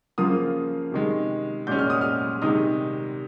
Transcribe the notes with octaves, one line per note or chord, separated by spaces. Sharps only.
C#3 F3 A#3 F4 D#6
C3 D#3 G#3
A#2 G#3 C#4 G6
F6
D#6
F6
C3 D#3 G#3 D#4 D#6